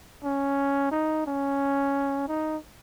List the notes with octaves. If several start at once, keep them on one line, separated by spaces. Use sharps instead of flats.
C#4
D#4
C#4
D#4